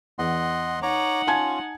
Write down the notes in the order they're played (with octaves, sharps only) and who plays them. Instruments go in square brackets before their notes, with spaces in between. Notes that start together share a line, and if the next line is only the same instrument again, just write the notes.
[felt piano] E2 [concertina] D#5 F#5 C6
[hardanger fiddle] D#4 F#5 [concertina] C#5 A#5 D6
[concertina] C#4 F4 [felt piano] G#5 A5 G#6